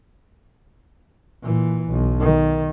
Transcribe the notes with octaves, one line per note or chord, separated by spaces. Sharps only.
A#2 E3
B1
D#3